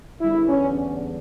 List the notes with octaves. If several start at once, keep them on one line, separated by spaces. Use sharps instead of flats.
E2 D3 G3 E4
C#4
C#4